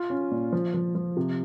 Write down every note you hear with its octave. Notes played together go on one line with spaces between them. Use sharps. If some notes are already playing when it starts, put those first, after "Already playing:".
Already playing: F4
C#4
A#2
F3
F3
F3
C3